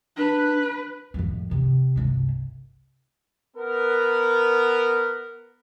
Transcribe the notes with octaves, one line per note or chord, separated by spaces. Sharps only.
D4 B4
F2 A2
C3
G1 C2
B3 A#4